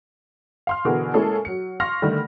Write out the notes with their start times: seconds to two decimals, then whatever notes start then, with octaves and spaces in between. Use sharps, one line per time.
0.67 F5 C6 F6
0.85 B2 D3 E3 F#4 G#4 A#4
1.14 G#3 A#3 C#4 E4 G#4 A4
1.45 F#3 C#7
1.80 F5 C6 C#6 F6 A#6
2.02 D3 D#3 G3 A3